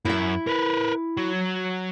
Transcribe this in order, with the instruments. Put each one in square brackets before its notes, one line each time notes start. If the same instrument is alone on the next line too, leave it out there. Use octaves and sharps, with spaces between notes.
[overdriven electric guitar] F#2 [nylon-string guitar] E4 E5
[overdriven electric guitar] A#4 B4
F#3